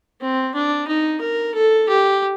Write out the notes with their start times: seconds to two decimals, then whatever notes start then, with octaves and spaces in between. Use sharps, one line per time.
0.21 C4
0.54 D4
0.87 D#4
1.21 A#4
1.54 A4
1.89 G4